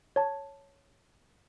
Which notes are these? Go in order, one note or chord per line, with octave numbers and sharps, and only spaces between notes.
C#5 A5